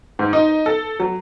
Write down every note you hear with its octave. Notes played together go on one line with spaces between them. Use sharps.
G#2
D#4
A4
F#3